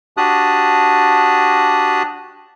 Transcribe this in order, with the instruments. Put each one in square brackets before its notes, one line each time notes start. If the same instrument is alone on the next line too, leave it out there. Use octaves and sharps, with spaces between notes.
[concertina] D4 F#4 G4 A5 D#6 F#6